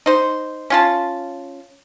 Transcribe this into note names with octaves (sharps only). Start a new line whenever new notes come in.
D#4 C5
C#4 F4 A5